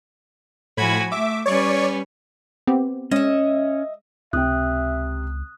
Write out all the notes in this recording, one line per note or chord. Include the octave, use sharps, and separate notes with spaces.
A2 F3 F#4 G#5 B5 G#6
A3 E5 D6
G3 C#4 B4 C#5 D5 C#6
B3 C4 G4
G#3 C#4 D#5 E5
C#2 C3 E5 G5 D#6 F#6